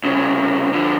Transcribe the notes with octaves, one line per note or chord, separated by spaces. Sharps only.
C2 C#3
D3 F3